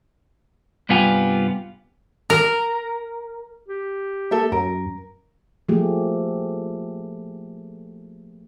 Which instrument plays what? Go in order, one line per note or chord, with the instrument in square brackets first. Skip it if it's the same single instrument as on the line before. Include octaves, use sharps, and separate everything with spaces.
[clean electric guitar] C2 G2 B3 F4 G4 G#5
[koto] A#4
[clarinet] G4
[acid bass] A#3 [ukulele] A4 E5
[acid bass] F#2 [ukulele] A#4
[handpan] F3 A3 A#3 G4 G#4